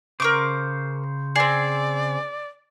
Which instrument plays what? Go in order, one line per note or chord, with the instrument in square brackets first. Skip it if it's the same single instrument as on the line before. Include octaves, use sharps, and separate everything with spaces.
[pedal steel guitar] C#3 C5 [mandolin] A#4 C#6 D6
[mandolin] C4 G#4 [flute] D5